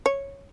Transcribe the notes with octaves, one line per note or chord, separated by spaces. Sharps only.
C#5